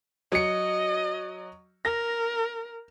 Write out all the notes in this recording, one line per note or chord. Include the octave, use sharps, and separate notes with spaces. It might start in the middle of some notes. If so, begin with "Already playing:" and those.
F#3 D#5 C#7
A#4 A#6